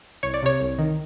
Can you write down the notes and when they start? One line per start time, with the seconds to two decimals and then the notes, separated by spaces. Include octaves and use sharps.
0.23 C2 C#5
0.34 D5
0.43 C3 C#5
0.60 C2
0.79 D#3